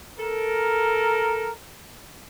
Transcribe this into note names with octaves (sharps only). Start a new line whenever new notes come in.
A4 A#4